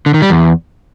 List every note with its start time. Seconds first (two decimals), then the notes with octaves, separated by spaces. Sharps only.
0.06 D3
0.14 D#3
0.22 G3
0.30 E2